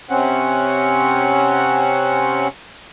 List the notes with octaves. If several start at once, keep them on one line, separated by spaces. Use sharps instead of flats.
C3 C4 C#4 F#5